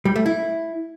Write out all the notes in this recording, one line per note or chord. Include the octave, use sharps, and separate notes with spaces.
G3
A3
E4